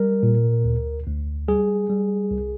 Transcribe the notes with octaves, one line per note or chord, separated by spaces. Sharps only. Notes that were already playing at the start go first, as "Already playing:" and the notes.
Already playing: G3 A#4
A#2
D2
D2
G3 G#4
G3
C2